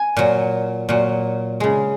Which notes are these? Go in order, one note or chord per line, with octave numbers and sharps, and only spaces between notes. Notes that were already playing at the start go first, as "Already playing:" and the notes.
Already playing: G#5
A#2 F#3
A#2 F#3
C#3 G#3